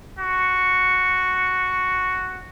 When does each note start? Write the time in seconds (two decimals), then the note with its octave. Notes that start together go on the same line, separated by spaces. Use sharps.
0.19 F#4 C#6